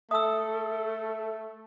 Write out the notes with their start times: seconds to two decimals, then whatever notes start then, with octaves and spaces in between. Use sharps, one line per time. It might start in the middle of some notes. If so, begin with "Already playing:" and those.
0.11 A3 A4 E5 A5 D#6 E6